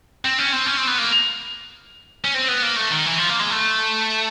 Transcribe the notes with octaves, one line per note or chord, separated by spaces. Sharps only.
C4
C#4
C4
C#4
C4
B3
A#3
C#4
C4
B3
A#3
A3
D#3
E3
F3
A#3
G#3
A3